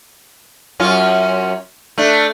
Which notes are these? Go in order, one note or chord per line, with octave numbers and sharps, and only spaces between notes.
F#2 C#4 F4
A3 D4